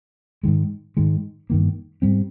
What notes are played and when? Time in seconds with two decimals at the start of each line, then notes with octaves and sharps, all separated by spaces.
0.43 G#2 D#3 G#3
0.97 G#2 D#3 G#3
1.50 G2 D#3 A#3
2.02 G#2 G3 C4